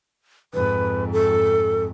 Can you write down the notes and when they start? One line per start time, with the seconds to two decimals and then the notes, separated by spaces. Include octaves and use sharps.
0.54 F2 G#2 B4
1.12 A4